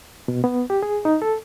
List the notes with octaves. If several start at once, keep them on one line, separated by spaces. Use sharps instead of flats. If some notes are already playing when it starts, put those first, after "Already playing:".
B2
B3
G4
G#4
D#4
A4